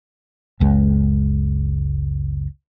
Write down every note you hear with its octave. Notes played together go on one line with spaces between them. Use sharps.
F#1 C#2 G#3